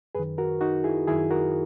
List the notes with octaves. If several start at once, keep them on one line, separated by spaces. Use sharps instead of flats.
F#2 D#3 G#4 B4
F#4 A#4
D#4 F#4
E4 G#4
F#2 D#3 E4 G#4
F#4 A#4